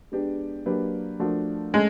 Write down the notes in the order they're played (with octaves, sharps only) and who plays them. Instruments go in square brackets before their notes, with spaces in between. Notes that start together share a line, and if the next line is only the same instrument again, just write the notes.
[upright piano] G#3 B3 D4 G4
F#3 A#3 D4 G4 B4
F3 A3 D4 F#4 A#4
[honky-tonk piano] G#3 [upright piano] A3 C#4